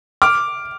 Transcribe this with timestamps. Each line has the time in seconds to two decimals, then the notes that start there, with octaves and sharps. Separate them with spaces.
0.22 D6 F6